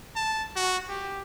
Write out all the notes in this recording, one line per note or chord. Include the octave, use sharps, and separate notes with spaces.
A5
F#4
G4